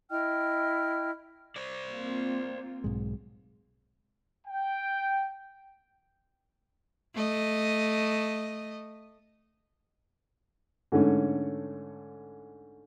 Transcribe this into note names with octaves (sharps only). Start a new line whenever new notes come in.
E4 D#5 G5 F6
C5 D5
A#3 C4 F4
B1 G#2 G#3
G5
A3 D#5
G#2 D3 A3 C#4